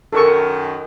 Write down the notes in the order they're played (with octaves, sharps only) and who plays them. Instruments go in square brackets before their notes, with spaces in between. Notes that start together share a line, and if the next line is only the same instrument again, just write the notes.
[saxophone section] F#2 D#3 [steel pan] A4 A#4 C#6